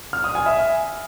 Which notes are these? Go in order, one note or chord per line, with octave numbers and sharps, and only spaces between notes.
F6
D#6
G#5
E5